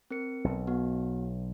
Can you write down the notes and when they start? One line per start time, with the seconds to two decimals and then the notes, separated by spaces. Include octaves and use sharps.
0.10 C4 A#4 C#7
0.44 B1
0.67 B3 F#4